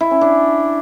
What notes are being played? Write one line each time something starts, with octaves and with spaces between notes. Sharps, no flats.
E4
C#4
D4